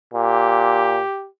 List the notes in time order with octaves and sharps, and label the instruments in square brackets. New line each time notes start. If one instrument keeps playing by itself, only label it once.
[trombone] A#2 [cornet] G4